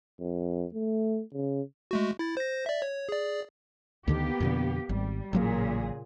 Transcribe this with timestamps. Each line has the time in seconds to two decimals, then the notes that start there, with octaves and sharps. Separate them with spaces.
0.20 F2
0.73 A3
1.33 C#3
1.91 G#3 A3 F#4
2.19 E4 A6
2.37 C5 A#6
2.66 D5 E5
2.82 C#5
3.09 G#4 D5
4.08 D2 D3 D#3 A#3 B3 G4
4.40 F2 B2 D3
4.89 G#1 G3
5.33 A1 A#2 C#3 F#3 A#3 G#4